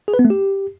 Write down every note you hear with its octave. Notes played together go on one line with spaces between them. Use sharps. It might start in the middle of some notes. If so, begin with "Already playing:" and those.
G#4
B4
B3
A3
G4